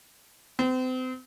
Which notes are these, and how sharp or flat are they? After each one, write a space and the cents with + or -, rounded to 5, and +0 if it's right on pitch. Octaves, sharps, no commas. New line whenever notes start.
C4 -35